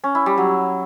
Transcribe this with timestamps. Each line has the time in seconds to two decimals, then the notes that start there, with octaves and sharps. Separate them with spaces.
0.04 C#4
0.15 E4
0.26 G3
0.37 F#3